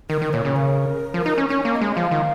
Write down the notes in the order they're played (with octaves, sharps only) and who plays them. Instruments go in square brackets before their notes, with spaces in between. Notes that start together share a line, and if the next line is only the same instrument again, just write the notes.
[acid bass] D#3 [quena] A#4
[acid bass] D#3
[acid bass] A#2 [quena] C#5
[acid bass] C#3
[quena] A#4
[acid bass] F3
D#4
C#4
[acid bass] C#4 [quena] C#5
[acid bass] A#3
[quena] D#5
[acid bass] G#3
[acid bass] F3 [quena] F5
[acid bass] D#3